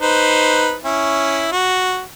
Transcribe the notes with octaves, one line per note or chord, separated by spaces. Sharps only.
D#4 B4 C5
C#4 E4
F#4